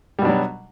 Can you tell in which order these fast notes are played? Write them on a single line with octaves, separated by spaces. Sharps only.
G3 B2 D4 F#3